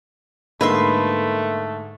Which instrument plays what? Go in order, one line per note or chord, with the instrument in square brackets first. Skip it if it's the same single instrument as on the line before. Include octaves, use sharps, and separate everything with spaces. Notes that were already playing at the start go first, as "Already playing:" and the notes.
[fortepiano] G#2 D3 [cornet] A3 [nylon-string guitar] A#3 D#5 [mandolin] B4 E5 C6